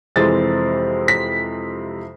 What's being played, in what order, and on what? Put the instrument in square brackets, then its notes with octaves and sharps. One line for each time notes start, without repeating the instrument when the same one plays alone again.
[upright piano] F2 C3 E3 G#3 C4 A6
B6